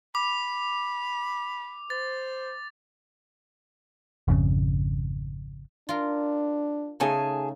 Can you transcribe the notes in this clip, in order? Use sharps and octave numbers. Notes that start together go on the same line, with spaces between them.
B5 D6
C5 A6
G#1 F2 C#3
D4 F4 A#4
C#3 A3 D#4 G#4 G#5 A5